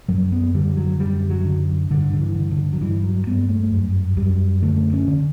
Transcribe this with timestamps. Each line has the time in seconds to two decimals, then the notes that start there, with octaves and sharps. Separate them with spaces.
0.09 F#2 F#3
0.32 B3
0.55 D3 G3
0.77 F#3
0.99 F#2 G3
1.30 F#3
1.45 D3
1.90 G2 D3
2.13 D3
2.20 E3
2.35 D3
2.51 D3
2.73 F#3
2.81 G2 E3
3.03 F#3
3.26 G2 B3
3.49 A3
3.71 F#2
4.17 F#2 G3
4.62 D3 A3
4.93 C#4
5.08 D3